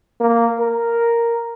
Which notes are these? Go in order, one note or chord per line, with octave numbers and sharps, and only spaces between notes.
A#3
A#4